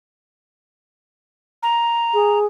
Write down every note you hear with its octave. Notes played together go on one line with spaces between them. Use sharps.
A#5
G#4